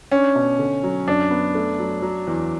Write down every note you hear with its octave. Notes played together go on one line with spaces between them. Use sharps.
C#4 D4
B2
D3
F#3
F#2 D4
B3
A3
F#3
F#3
E2